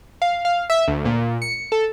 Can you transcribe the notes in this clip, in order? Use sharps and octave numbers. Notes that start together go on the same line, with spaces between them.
F5
F5
E5
D2
A#2
C#7
A4